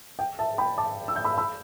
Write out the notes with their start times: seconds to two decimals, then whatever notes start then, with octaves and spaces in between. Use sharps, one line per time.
0.19 G5
0.39 E5 A5
0.58 G5 B5
0.78 A5 D6
1.08 E6
1.16 G6
1.24 B5 E6
1.38 B5 E6